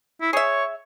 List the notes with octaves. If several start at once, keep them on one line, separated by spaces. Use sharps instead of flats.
E4
G#4 C#5 E5